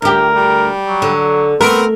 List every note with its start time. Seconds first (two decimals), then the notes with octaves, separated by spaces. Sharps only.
0.02 D2 G4 A#4
0.35 G3
0.88 F#3
1.02 D3
1.61 A3 B3 C4 A#4